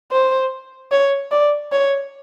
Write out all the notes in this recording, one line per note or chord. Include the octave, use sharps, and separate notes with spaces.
C5
C#5
D5
C#5